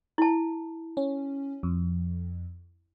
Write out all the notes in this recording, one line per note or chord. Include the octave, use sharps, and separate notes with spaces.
E4 A5
C#4
F2